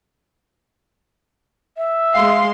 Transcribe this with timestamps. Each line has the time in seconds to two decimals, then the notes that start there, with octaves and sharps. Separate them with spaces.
1.77 E5
2.15 G#3 F5 C6